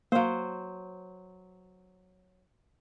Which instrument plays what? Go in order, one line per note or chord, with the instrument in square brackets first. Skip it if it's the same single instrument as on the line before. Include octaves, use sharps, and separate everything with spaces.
[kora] F#3 C5 [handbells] A#3 F5